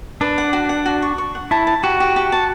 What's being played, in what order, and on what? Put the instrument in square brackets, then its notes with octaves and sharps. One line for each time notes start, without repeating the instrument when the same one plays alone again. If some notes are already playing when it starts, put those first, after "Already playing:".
[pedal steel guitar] D4 [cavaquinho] B4
[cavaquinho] F#5
F#4
F#5
F#4
C#6
C#6
F#5
[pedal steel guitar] E4 [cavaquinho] A5
[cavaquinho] A5
[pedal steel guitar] F#4 [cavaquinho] G4
[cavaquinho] G4
G4
A5